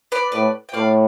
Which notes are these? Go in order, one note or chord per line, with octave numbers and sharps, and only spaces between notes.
B4 D5
A2 B4 D5
G5
A2 D5 F5